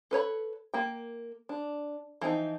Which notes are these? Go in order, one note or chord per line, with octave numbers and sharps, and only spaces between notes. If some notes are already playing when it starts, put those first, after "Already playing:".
A4 B4 C#5 B5
A#3 G5
D4
E3 F3 C4 D#4